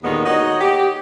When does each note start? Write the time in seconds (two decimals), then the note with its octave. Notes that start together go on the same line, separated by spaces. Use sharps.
0.03 D#2 A#2 D3 D#3 G#3 B3
0.25 D#4 F#4 C#5 D#5
0.61 G4